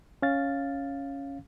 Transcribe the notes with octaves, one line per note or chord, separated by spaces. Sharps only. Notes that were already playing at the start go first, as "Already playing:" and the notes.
C#4 F5 A6